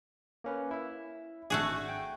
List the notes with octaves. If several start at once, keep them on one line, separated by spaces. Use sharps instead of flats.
A#3 C#4 B4
E4 E5
G#1 A3 D4 F#4 G#4 F#5
G5